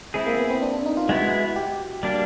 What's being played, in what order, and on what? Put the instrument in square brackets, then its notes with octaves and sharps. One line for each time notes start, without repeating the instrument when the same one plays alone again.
[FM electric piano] G#3 [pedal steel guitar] C4 E4 G#4
[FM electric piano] A#3
B3
C4
D4
D4
D#4
F4
[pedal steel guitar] G#3 B3 E4 [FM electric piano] F#4
[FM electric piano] G4
[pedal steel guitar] G3 A#3 D4